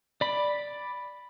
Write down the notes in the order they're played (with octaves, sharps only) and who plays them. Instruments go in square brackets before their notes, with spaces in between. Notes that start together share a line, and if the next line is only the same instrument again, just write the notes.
[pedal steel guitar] D5 B5